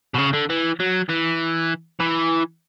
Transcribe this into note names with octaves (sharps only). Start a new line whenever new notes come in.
B2
C#3
D3
E3
F#3
E3
E3